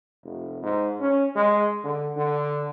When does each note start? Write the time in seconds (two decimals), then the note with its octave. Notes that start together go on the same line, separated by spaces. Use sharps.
0.24 F1
0.62 G#2
0.99 C#4
1.35 G#3
1.84 D3
2.17 D3